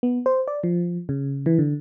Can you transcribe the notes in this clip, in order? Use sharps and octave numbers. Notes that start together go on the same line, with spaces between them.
B3
C5
D5
F3
C#3
E3
D3